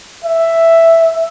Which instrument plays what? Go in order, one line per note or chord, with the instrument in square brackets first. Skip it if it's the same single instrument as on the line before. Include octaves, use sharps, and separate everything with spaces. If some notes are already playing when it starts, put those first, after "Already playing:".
[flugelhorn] E5